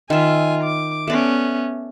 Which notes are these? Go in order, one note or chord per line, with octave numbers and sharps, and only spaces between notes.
D#3 F4 E5 G#5
D6
A3 B3 C#4 D5